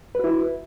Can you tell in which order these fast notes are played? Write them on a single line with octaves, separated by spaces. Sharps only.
B4 F#4 E4